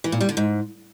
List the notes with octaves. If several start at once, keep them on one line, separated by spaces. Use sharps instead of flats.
E3
A#2
G3
D3
G#2